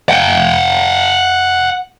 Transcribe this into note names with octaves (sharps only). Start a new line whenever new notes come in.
F#5 G5